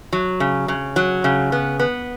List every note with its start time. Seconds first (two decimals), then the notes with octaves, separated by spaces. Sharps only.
0.13 F#3
0.40 C#3
0.68 C#3
0.96 F#3
1.24 C#3
1.52 B3
1.79 B3